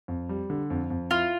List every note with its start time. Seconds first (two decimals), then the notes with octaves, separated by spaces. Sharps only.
0.08 F2
0.29 G3
0.50 D3
0.70 F2
0.90 F2
1.11 E4 F4